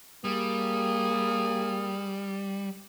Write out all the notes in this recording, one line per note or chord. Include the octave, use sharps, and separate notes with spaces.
G3 A#3 G#4